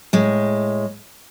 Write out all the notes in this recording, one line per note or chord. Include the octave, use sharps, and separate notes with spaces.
A2 G#3